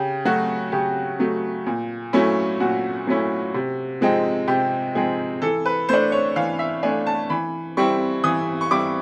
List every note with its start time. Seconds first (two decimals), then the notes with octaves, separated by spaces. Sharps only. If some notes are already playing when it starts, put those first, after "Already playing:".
Already playing: C#3 G4
0.25 F#3 A3 F#4
0.72 C#3 G4
1.20 F#3 A3
1.66 A#2
2.13 F#3 A3 C#4 E4
2.60 A#2 F#4
3.07 F#3 A3 C#4 E4
3.54 C3
4.01 F3 G#3 C4 D#4
4.48 C3 G4
4.95 F3 G#3 C4 D#4 G#4
5.42 E3 A4
5.65 B4
5.89 A3 D4 C5
6.12 C#5
6.36 E3 F5
6.59 E5
6.83 A3 D4 G#5
7.06 A5
7.30 E3 B5
7.77 G3 C4 E4 C#6
8.24 E3 D#6
8.61 C#6
8.71 G3 C4 E4 D6